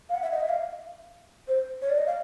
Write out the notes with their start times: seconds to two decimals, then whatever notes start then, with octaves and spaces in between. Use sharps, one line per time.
0.09 F5
0.14 F#5
0.23 E5
0.32 D#5
0.40 E5
0.49 F5
1.48 C5
1.82 C#5
1.90 D5
1.98 D#5
2.07 F5